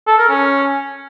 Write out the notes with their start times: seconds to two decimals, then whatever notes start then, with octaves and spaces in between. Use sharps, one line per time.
0.07 A4
0.18 A#4
0.29 C#4